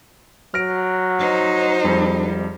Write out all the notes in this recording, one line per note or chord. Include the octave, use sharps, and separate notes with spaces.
F#3 F6 A#6 D7
D#4 C5
G#1 F2 G3